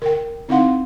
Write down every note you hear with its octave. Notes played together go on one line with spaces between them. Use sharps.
A#4 G5
C4 D#4 E4 F5 F#5 C6